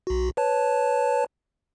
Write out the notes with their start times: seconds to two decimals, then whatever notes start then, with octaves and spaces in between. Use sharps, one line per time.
0.07 B1 F#4
0.37 B4 C#5 A5